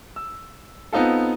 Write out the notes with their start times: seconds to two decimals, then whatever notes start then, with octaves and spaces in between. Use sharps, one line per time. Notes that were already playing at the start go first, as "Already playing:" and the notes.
0.16 E6
0.93 B3 C4 D#4 F4 A4